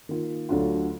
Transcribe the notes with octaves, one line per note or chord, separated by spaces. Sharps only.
D#3 A#3 F4
D2 D3 F#3 D4 F4